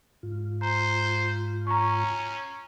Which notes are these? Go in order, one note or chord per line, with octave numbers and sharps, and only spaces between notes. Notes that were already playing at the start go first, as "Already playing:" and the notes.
G#2 F4
C5 A#5
C#4 A#5 C#6